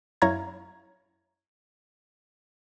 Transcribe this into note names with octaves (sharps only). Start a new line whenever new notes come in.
F#2 E4 C#5 F5 A#5 G#6